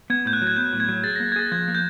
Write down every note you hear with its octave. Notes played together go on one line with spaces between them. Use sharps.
B3 G#6
A2 G6
F#6
F#3
G#6
B3 G6
A2
G#6
F#3
G#4 A6
A#6
A#3
G#6
G#4 A6
F3 G#6
A#3
G6